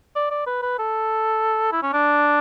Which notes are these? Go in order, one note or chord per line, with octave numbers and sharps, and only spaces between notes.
D5
D5
B4
B4
A4
E4
C#4
D4